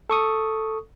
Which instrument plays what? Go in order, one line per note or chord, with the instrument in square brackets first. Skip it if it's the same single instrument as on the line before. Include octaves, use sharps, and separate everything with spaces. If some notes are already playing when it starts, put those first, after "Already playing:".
[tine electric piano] A4 C#6 D#6